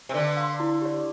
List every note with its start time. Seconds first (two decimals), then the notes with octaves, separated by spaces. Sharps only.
0.09 C3
0.14 D3 B4
0.37 F5 C6
0.60 E4
0.82 G4 D5